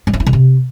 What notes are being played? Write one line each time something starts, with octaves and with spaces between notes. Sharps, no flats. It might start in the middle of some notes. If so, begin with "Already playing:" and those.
G3
F3
E4
D3
C3